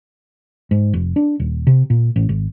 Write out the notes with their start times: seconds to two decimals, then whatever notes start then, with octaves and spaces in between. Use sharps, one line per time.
0.71 G#2
0.93 F1
1.16 D4
1.40 D#1
1.67 C3
1.90 A#2
2.16 A1
2.29 G#1